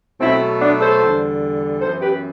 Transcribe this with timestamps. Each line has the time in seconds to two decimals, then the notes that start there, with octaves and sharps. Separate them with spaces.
0.20 B2 F#3 A3 C4 E4
0.61 B3 D4
0.81 A4 C5
1.01 E2 D3 G3
1.81 F#2 E3 B3 A4 C5
2.02 G4 B4